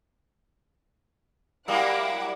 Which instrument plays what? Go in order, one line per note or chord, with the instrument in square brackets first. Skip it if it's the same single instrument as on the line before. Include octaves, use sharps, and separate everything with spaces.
[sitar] F#3 G3 A#3 [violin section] E4 F#5 D6 [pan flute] F5